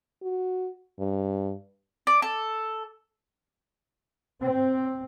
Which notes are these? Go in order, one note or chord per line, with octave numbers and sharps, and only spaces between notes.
F#4
G2
D5
A4
C4